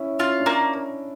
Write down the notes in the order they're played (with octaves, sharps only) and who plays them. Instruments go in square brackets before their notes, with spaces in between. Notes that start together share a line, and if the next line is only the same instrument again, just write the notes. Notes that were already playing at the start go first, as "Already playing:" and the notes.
Already playing: [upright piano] C#4 E4
[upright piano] C#4 [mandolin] F4
[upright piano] D4
[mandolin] A#3 [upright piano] C#4